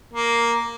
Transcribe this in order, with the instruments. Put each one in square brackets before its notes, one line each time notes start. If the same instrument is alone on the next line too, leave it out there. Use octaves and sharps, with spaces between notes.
[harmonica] A#3